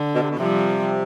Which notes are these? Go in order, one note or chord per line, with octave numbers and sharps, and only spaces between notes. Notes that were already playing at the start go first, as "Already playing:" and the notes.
Already playing: D3
B2
C3
B2
C3 F3 G3